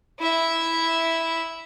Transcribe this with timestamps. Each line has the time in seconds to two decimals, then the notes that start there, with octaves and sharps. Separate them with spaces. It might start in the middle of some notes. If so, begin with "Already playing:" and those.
0.19 E4 E5